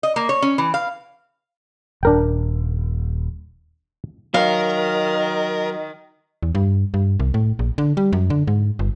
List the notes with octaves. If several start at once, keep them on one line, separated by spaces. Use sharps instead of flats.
D#5
A#3
C#5
C#4
E3
F5
D#1 D4 A#4 G5
D#3 F#3 A#4 F5
E2
G2
G2
C2
A2
A#1
D3
G3
F#2
D3
G#2
G1